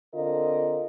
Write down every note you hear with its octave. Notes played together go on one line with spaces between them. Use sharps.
D3 C4 F4 A#4 D#5